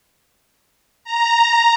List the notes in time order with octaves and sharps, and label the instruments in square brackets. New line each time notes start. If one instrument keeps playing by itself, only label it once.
[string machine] A#5